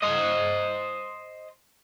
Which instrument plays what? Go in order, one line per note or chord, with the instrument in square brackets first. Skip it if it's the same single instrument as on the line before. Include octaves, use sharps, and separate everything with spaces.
[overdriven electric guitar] C5 D#5